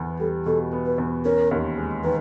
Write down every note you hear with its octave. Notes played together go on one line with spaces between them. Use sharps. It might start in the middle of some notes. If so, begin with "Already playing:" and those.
Already playing: E2 B3
G3 A4
B2 A4
B3
B4
E2
C#4 A#4
D#2
G#3
D#3 B4